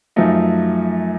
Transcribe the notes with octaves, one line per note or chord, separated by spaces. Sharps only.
F#2 F3 A3 D#4